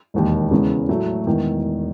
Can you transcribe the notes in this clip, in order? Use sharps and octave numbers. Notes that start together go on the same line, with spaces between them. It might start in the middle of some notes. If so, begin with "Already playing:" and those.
E1 D#2 D#3
E2 C#3 G#3
A2 F#3 A3
E1 E2 D#3